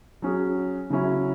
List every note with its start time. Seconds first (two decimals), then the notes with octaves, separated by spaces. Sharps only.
0.22 F#3 C#4 G#4
0.90 C#3 F#3 C#4 E4